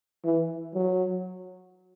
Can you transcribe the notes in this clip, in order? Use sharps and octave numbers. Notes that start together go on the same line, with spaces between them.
E3
F#3